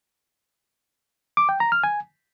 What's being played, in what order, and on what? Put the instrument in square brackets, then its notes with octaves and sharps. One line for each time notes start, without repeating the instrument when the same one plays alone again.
[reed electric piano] D6
G5
A#5
F6
G#5